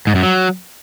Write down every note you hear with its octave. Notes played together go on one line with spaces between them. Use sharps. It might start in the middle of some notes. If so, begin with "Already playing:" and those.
G#2
F#2
F#3